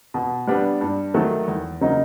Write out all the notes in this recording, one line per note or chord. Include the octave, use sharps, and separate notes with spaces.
B2
G3 B3 D4
G2
D#3 F#3 A3
E2
C#3 F#3 A#3 D#4